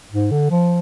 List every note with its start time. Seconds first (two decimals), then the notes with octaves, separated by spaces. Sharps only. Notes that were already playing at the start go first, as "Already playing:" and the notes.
0.12 G#2
0.31 D3
0.51 F3